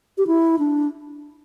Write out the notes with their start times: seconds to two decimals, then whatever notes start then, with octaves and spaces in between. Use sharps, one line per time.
0.18 G4
0.27 E4
0.59 D4